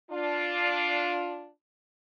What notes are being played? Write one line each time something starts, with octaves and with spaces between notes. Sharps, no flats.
D4 F4